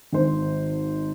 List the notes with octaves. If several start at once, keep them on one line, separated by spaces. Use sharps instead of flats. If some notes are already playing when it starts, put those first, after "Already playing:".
G#1 C5